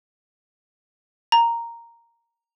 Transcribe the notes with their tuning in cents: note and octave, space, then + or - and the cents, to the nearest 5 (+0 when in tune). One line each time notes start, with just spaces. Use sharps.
A#5 -5